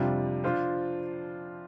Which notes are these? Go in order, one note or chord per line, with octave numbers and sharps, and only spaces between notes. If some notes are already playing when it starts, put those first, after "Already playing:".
Already playing: F2 C3 G3 D4 F4
F3 D4 F4 C5